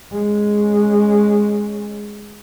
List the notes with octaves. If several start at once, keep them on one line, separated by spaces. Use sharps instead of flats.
G#3 C#4